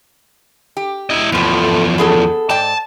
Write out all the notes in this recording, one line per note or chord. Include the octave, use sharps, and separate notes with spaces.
G4
E4 D#5
E2 A2 F3 A3
B3 G#4 A4
G#2 D5 G5 A5